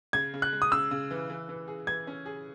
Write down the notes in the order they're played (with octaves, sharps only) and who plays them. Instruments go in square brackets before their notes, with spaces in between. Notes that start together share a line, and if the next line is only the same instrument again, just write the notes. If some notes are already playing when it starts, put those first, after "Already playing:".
[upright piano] C#3 [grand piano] G#6
[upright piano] C#3
[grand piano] F#6
[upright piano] G#3
[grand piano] D#6
[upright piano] C#3 [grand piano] E6
[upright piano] C#3
E3
E3
E3
G#4
[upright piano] E3 [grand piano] G#6
[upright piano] C#4
G#4